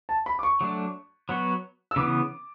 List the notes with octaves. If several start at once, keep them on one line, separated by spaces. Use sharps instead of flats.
A5
B5
D6
C#6
F#3 A3 D4
F#3 B3 F#4
E6
C#3 E3 B3 D6